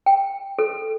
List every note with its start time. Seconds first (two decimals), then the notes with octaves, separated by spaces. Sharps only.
0.06 G5
0.59 A4